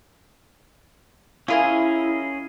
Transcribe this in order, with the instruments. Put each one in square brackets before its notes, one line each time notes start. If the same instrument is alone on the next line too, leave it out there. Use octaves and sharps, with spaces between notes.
[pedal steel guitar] C#4 G#4 D#5 [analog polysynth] E4 [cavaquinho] F4 A#4 G#5